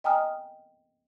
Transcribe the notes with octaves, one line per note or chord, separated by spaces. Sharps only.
D#5 G5 G#5 A#5 D#6 F6